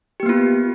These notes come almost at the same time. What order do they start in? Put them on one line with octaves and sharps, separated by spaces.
G4 A#3 B3 F4